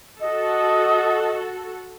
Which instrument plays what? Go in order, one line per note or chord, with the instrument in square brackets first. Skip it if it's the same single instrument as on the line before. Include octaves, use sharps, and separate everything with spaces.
[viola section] F#4 A4 [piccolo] D#5